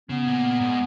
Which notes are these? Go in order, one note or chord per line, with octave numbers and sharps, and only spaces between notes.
C#3 B3
A#2
G#2